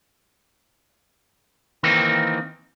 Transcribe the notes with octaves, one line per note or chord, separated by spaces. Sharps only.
D#3 E3 A#3 C4 D#4